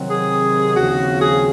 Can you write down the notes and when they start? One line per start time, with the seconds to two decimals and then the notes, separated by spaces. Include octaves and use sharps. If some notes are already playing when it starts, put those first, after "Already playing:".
Already playing: C3 D#3 F#3 C4
0.10 G#4
0.76 D#2 C#3 F3 C4 F#4
1.21 G#4